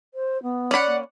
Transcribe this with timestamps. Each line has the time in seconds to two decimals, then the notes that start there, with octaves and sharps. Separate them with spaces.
0.14 C5
0.43 B3
0.71 C#4 D5 F#5 B5
0.87 A#3